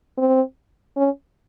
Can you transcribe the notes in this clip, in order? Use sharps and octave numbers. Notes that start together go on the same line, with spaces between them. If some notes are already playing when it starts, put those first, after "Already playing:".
C4
C#4